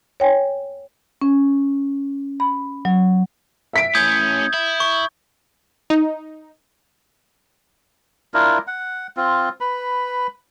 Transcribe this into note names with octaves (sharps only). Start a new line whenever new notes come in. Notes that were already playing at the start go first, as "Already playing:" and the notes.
C#5 G5 G#5
C#4
B5
F#3
E5 B6 D7
A2 C#4 D#6 G6 G#6
E4
C#6
D#4
D4 E4 F4 A#4
F#5
C4 F4
B4 B5